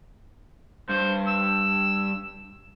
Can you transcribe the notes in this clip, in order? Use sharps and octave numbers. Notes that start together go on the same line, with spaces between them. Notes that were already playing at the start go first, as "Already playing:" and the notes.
G2 C5
E6